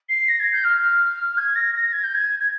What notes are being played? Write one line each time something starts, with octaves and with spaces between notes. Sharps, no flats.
C7
A#6
G#6
G6
F6
G#6
A#6
A#6
G#6
G6
G#6
G#6